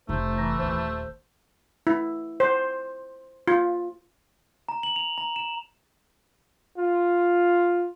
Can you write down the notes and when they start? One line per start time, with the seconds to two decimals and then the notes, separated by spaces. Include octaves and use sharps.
0.09 F1 A3 D#4 C5
0.38 E3 A#5
0.59 D#1 D#2 C5
1.87 E4
2.40 C5
3.48 F4
4.69 A#5
4.83 F#7
4.96 F7
5.18 A#5
5.36 E7
6.77 F4